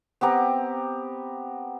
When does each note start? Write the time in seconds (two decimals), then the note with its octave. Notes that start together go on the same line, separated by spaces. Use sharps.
0.21 B3 C4 G4 A#5